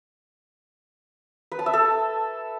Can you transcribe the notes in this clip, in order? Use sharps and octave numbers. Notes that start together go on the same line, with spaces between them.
B4
A5
E5
A4